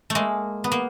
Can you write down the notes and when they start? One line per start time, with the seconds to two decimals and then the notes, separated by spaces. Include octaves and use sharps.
0.10 A3
0.15 G#3 A#3
0.64 B3
0.72 A#3